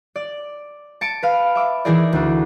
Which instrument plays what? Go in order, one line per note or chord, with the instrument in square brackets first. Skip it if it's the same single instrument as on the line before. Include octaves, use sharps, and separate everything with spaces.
[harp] D5
A5 C#7 D7
B4 F5
E5 D6
E3 D#4 E4 G#4 A#4 D5
D2 D4